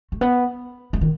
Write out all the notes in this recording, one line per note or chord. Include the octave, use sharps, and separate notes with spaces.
A3
B3
G#3
D#3